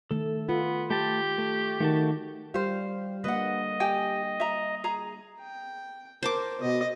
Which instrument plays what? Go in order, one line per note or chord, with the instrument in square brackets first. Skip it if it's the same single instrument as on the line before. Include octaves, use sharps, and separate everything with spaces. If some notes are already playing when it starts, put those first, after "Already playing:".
[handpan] D#3 A3 [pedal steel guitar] A4
[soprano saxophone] B3 [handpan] F4
[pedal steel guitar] A3 A5 G6 [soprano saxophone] G4
[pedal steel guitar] A3
[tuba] D#3 [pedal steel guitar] A3 F#4 A5
[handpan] G3 F5 [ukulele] G4 C5
[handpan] D3 A#3 [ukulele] B4 F#5 [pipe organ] D#5
[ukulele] G4 G5 G#5
E5 A#5
G#4 A#5
[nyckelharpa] G5
[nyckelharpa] A#4 [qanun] C5 A5 D6
[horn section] B2 [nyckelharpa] D#5